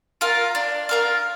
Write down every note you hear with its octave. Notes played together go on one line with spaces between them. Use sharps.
F4 A#4 F5
D4
F4 A#4 F5